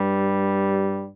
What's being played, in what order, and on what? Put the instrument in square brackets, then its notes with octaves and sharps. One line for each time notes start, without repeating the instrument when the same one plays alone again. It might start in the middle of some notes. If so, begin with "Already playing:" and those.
Already playing: [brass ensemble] G2 G3